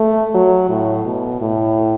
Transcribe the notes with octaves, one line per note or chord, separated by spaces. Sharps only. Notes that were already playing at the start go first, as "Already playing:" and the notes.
Already playing: A3
F#3
A2
B2
A2